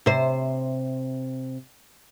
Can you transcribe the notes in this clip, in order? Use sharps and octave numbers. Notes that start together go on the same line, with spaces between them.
C3 C5